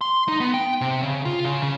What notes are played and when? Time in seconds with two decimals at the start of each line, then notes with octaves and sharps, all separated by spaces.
0.01 C6
0.28 D#4
0.40 B3
0.54 G5
0.81 C3
1.03 C#3
1.25 F4
1.45 C#3
1.63 C#3